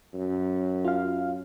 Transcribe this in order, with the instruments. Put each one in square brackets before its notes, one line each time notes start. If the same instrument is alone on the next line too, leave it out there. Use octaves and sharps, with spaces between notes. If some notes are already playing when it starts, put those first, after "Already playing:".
[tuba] F#2
[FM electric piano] F4 F5